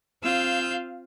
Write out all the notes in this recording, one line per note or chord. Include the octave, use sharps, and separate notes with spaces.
C4 F4 F5 E6 G6